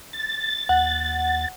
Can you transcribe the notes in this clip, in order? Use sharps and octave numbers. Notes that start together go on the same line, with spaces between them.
A6
D#2 F#5